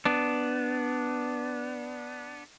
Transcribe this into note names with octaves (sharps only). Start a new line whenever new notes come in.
B3 D4